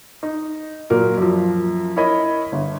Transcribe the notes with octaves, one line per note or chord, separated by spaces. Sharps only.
D#4
A#2 F#3 A#4
F#2 F3
E4 A#4 C#5 D#5 B5
G1